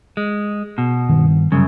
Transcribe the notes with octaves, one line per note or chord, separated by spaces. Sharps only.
G#3
B2
G2 D#3
C2 F#2 C#3 G3